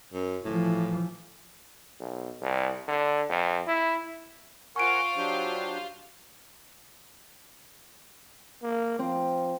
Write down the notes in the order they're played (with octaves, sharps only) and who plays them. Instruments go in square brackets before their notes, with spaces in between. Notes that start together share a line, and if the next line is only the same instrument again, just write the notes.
[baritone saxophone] F#2
[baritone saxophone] A2 [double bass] E3 F3
[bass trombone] B1
C2
D3
F2
E4
[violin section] F4 C5 F5 [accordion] A#4 F#5 G#5 [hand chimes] C#6 D7
[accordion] F#3 D4 G4
[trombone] A#3
[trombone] F3 [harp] C4